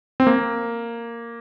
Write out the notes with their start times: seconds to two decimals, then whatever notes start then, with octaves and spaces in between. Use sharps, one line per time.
0.20 C4
0.27 A#3